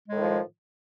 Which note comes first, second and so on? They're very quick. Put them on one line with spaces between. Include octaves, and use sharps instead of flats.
G#3 A2 D#3 F3